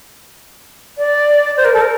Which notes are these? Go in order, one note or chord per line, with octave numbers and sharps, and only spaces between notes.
D5
C5
A#4
A4
A#4